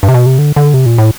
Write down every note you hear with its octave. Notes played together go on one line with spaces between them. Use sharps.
G2
C3
B2
C3
D3
D3
C3
A#2
A2